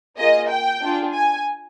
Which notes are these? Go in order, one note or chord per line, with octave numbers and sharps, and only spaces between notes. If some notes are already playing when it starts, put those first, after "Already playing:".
A#3 F4 G#4 D#5
G5
D4 F4 G#4
G#5